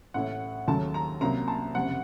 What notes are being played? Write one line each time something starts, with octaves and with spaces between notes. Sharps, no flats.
A1 A2 A3 F#5
D#2 C#3 F#3 A3 A5
A#5
C2 C3 F#3 A#3 A#5
A5
F#1 F2 C3 F#5